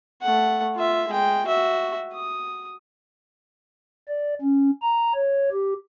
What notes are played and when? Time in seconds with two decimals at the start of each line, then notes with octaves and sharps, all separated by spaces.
0.23 A3 F#5
0.75 F4 E5
1.09 G#3 G5
1.46 F#4 E5
2.14 D#6
4.08 D5
4.41 C#4
4.82 A#5
5.15 C#5
5.52 G4